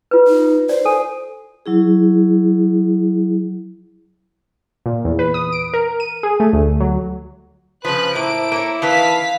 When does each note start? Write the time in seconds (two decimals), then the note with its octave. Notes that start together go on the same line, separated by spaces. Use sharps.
0.11 F4 B4
0.27 D#4
0.69 C5 D5
0.85 A4 G#5
1.66 F#3 E4 G#4
4.86 A#2
5.05 E2
5.19 B4
5.34 D#6
5.52 D7
5.74 A#4
6.00 D#7
6.23 G#4
6.40 A3
6.53 D2
6.80 F#3
7.85 C#3 F3 B4 C5 F#6
8.15 A2 A#3 E4 D7
8.52 A#3 C#5
8.82 D#3 E3 B4 F5 A5 B6